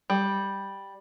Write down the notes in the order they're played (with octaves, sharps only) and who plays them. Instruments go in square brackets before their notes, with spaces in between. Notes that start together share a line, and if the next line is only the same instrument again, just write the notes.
[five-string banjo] G3